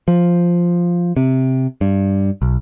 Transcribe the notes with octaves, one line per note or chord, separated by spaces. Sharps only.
F3
C3
G2
B1